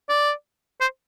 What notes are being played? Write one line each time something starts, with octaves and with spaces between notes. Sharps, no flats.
D5
C5